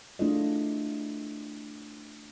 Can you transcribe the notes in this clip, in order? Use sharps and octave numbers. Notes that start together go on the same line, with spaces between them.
A3 D4 E4 F4 G#4 D#5